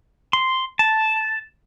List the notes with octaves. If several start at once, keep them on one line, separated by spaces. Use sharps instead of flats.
C6
A5